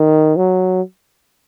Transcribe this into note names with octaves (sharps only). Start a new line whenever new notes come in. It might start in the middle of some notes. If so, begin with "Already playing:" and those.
Already playing: D#3
F#3